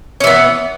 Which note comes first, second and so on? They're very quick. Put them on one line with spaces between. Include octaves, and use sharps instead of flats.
C#4 E3 B3